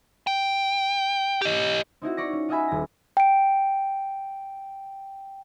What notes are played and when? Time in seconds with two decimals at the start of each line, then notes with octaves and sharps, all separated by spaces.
0.27 G5
1.42 G4 D#5
2.02 C4 D#4 E4 F#4
2.17 D5 C#6 A#6
2.33 C#4
2.48 F4 F#4 D#5 E5 G#5 B5
2.68 D#1 A#6
3.17 G5 D7